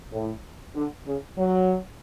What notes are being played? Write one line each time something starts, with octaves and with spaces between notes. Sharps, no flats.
A2
D3
C#3
F#3